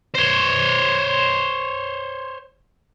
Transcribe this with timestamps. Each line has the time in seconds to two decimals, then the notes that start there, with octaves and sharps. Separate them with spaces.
0.14 C5 C#5